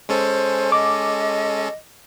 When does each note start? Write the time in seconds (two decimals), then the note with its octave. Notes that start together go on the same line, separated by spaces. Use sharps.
0.09 G#3 C#4 A4 C5
0.72 D#5 D6